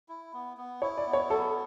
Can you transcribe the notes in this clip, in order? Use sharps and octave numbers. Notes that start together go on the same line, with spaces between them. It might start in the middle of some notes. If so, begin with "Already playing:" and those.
E4
B3
B3
E4 C#5
D5
B3
C#5
F#3 A4